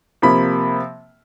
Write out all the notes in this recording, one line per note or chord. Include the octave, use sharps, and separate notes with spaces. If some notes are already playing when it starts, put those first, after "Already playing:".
C3 F3 A#3 B5